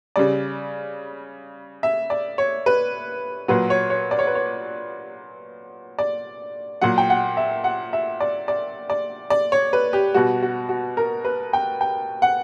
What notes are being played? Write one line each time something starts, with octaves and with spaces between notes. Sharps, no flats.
C#3 G3 D5
E5
D5
C#5
B4
A#2 F#3 B4
C#5
C#5
D5
C#5
B4
C#5
D5
A#2 F#3 F#5
G5
F#5
E5
F#5
E5
D5
D5
D5
D5
C#5
B4
G4
B2 G3 F#4
F#4
F#4
A#4
B4
G5
G5
F#5